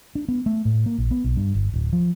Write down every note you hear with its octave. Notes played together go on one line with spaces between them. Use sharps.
D4
B3
A3
A2
A#3
A#1
B3
B1
G2
G1
D1
F3